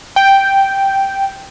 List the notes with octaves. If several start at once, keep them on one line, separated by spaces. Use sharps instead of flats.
G5